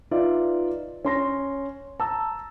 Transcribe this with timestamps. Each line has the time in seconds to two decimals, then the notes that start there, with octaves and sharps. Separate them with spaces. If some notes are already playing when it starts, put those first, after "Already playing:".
0.11 D#4 F4 B4 D5 E5
1.05 C#4 C6 A#6
2.00 A5 A#5 E6